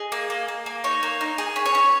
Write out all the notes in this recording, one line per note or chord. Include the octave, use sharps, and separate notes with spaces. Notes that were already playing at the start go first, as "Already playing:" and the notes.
Already playing: G#4 D#5
A#3
A#3
A#3
A#3
D#4 C#5
A#3
D#4
G#4
C#4
C#5
C#4